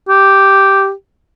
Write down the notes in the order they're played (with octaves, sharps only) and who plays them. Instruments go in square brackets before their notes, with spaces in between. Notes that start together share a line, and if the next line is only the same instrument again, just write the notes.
[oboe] G4